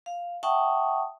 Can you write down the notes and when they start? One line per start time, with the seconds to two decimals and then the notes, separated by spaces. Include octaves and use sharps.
0.06 F5
0.43 E5 F#5 G5 A5 C#6 D#6